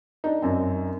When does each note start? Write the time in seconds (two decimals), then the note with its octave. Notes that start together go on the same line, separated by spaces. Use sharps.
0.24 D4 D#4
0.42 F#2 C4